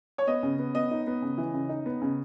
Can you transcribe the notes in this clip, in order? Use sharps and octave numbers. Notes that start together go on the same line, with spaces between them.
C#5
B3 D#5
C#3
B3
B3 D#5
D#4
B3
C#3
E3
C#3
D#4
B3
C#3